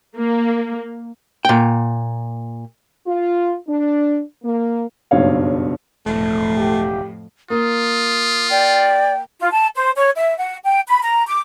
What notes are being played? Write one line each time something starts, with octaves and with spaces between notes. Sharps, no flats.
A#3
A#2 G5
F4
D4
A#3
F#1 B1 G2 C#5 F5
E1 F2 A2 A3
G4
A#3 F4 D#6
D5 G5
F4
A5
C5
C#5
E5
F#5
G5
B5
A#5
D6